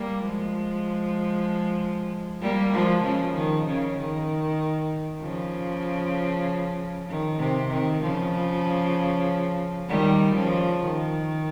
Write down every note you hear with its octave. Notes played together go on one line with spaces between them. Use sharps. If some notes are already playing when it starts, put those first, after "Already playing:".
Already playing: G3 A#3
F3 G#3
G3 A#3
F3 G#3
C#3 F3
D#3
C#3
D#3
C#3 F3
D#3
C3
D#3
C#3 F3
D#3 G3
C#3 F3
D#3